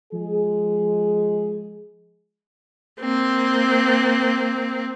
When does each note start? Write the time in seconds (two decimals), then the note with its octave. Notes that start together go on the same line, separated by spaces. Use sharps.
0.13 F3 G#3 G#4
3.01 A#3 C4